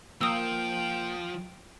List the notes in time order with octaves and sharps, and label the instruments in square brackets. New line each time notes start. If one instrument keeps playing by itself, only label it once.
[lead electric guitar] F3 [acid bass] A#3 [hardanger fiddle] G5 [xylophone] D#6 E6